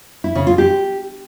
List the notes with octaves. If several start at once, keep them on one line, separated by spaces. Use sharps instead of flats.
E4
C#3
F4
G4